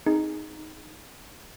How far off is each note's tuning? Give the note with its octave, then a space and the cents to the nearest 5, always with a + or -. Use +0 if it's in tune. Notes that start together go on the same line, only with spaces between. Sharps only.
C4 +0 D#4 +0 G#4 +0